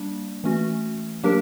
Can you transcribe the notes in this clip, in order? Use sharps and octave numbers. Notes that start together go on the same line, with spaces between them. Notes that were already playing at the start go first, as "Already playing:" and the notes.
Already playing: G3 A#3 D4
E3 A3 C#4 F#4
F#3 A#3 D4 G4 A#4